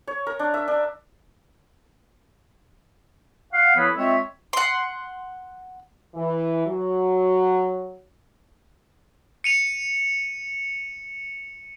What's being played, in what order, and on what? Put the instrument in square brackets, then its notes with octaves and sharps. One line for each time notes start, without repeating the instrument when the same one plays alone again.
[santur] C#5
A#4
D4
E5
D4
[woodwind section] F5 F#5
F3 B3 E4 A4 B4 C#5
G#3 C4 F4 C#5 E5
[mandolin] F#5 C6
[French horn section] E3
F#3
[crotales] C#7 D#7 F7